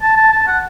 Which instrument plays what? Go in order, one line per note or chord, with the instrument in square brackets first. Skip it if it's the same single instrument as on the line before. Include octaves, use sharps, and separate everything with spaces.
[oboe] A5
A5
A5
F#5